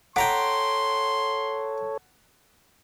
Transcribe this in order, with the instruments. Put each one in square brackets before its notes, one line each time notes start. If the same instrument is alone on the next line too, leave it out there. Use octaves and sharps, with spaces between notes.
[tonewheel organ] A4 C#5 [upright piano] F#5 B6 [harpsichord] G5 A#5 D6 [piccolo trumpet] C6